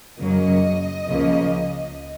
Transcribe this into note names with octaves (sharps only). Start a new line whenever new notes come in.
F#2 C#3 F#3 A#3 D#5
C#2 C#3 F3 A#3